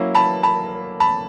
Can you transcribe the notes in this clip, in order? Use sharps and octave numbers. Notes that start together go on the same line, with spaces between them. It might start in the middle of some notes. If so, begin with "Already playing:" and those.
Already playing: F#3 A#3 C#4 E4
A5 B5
A5 B5
A5 B5